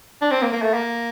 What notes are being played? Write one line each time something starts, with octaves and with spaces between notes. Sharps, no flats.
D4
C4
A#3
A#3
A3
A#3